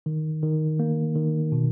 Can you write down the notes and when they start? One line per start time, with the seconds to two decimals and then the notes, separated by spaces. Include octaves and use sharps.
0.06 D#3
0.43 D#3
0.80 A#3
1.16 D#3
1.52 B2